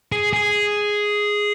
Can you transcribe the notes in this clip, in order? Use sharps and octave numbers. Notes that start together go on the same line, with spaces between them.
G#4
G#4